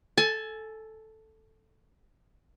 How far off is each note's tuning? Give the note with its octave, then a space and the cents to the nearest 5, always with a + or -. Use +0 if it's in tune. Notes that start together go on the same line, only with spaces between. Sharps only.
A4 +0 G#5 +25